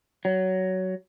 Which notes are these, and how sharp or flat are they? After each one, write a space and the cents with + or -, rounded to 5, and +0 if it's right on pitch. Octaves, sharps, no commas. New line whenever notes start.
F#3 +15